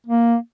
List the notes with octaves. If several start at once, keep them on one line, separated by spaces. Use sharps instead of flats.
A#3